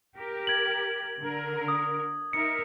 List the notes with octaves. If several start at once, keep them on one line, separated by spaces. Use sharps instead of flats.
G4 A#4
G#6 F#7
D3 A#4
D#6
D#4 A#4 E5 C#7